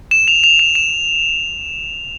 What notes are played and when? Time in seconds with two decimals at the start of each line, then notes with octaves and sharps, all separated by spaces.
0.11 E7
0.28 F7
0.44 F7
0.59 E7
0.75 E7